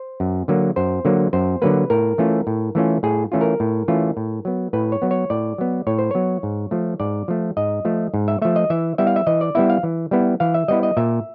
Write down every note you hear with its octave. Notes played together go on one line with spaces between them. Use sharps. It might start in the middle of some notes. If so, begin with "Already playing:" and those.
Already playing: C5
F#2
D3 F#3 A#3
F#2 C5
D3 F#3 A#3
F#2 C5
D3 F#3 A#3 B4
A2 A#4
E3 A3 C#4 F4
A2
E3 A3 C#4 F4
A2 G#4
E3 A3 C#4 F4
A#4
A2
E3 A3 C#4 F4
A2
F#3 B3
A2 B4
C#5
F#3 B3
C#5
A2 D5
F#3 B3
A2 C#5
C5
F#3 B3 C#5
G#2
F3 A3
G#2 D5
F3 A3
G#2 D#5
F3 A3
G#2
E5
F3 A3 E5
D#5
E3 E5
G3 B3 E4 E5
F5
E5
E3 D#5
D5
G3 B3 E4 E5
F5
E3
G3 B3 E4
E3 F5
E5
G3 B3 E4 D#5
D#5
A#2 E5